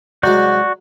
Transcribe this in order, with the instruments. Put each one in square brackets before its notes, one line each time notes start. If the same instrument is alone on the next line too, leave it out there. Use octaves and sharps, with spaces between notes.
[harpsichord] C2 F#3 G#3 [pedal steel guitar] F#4 D5 G6